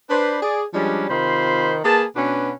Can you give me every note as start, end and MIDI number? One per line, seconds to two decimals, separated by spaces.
0.10 0.42 62
0.10 0.42 71
0.10 0.42 72
0.42 0.65 68
0.42 0.65 74
0.74 1.05 53
0.74 1.05 55
0.74 1.05 56
0.74 1.05 61
0.74 1.05 62
1.10 1.78 48
1.10 1.78 51
1.10 1.78 65
1.10 1.78 72
1.10 1.78 83
1.10 1.78 84
1.84 2.05 58
1.84 2.05 68
1.84 2.05 71
1.84 2.05 81
2.16 2.52 47
2.16 2.52 61
2.16 2.52 62
2.16 2.52 66
2.16 2.52 71